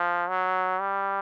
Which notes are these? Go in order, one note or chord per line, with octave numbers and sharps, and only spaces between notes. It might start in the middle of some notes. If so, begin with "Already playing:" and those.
Already playing: F3
F#3
G3